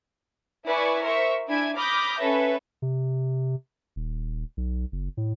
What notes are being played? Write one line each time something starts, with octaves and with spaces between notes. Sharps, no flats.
E4 B4 D5 E5 G#5 C#6
A#4 C5 E5 C#6
D4 E4 E5 G#5 G#6 D7
B5 D6 D#6 F6 G6 A#6
C#4 A4 B4 C#5 E5
C3
D#1
B1
F#1
A2